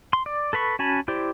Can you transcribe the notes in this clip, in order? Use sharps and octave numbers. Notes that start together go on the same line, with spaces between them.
C6
D5
A4 B4 B5 C#6
C#4 F#4 G#5 A5 B5
E4 G4 C5 D5